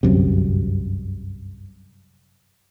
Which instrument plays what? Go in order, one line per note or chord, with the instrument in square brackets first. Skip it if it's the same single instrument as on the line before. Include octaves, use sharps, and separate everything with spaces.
[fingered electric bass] G1 C2 F#2 C3